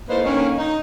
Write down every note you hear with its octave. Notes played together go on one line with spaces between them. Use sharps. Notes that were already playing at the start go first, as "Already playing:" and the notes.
A2 A3 A#3 D#4 B4 C5
D3 D#3 A#3 C#4
D#4